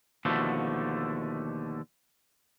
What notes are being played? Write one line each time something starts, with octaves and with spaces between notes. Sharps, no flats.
D#2 B2 D3 F3 A3